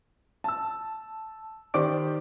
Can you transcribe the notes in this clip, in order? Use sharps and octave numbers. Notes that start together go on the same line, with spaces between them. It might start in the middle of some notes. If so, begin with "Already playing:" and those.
A5 E6
D#3 G4 C5 D5 D6 D7